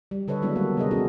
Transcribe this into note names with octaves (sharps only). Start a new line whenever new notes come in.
G3
D3 A4 B4 C#5 D#5
D#3 F#3 G#3 B3 D4 E4
G3 A#3
C3 B3 G4 G#4 A#4 D#5
C4 C#4 E4 F#4 G#4 A4